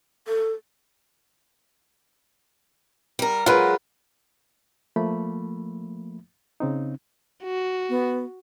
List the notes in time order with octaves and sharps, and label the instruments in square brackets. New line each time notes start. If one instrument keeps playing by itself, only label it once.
[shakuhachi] A4
[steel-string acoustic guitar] G3 A#4
[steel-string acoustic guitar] F#3 G#3 [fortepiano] F4 A#4 B4
[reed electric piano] F3 A3 A#3 B5
C#3 C4 D#4
[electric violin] F#4
[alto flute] B3